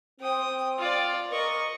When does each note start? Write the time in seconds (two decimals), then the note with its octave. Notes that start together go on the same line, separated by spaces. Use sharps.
0.20 C4 G5 D#6
0.79 F4 D5
1.31 A#4 D#5 C#6